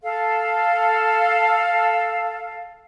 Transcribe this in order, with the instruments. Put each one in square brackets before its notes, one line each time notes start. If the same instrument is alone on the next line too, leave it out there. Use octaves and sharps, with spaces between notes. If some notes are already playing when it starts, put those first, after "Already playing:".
[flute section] A4 F5